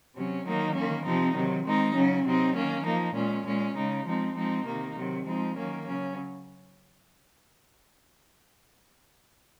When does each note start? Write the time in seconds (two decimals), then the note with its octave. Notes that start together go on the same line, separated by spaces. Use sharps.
0.15 C3 F#3 C#4
0.45 D#3 F#3 A#3 D#4
0.75 D#3 A#3 C#4
1.04 C3 F3 C4 D#4
1.34 C3 D#3 F#3
1.65 D#3 G#3 C4 D#4
1.94 C#3 F#3 C#4
2.25 C3 F#3 C4 D#4
2.55 D#3 A#3 C#4
2.85 F3 A#3 D#4
3.14 A#2 G#3 C#4
3.45 A#2 G#3 C#4
3.75 C#3 G#3 D#4
4.05 F3 G#3 C4 D#4
4.35 F3 G#3 C4 D#4
4.65 C3 D#3 A#3 D#4
4.95 C3 D#3 F#3
5.25 F3 G#3 C4 D#4
5.55 D#3 F#3 A#3 C#4
5.84 C#3 F#3 C#4